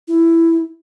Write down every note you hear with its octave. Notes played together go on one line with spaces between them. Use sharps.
E4